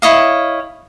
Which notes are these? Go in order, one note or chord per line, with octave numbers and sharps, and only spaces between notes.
E4 C#5 D#5 F5